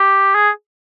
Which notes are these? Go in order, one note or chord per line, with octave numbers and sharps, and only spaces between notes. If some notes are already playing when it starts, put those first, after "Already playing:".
Already playing: G4
G#4